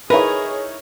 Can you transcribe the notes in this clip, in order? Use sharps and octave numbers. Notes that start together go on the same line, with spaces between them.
D#4 E4 G#4 A#4 B4 C#5